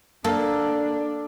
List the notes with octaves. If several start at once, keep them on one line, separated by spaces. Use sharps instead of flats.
A#3 D4 A4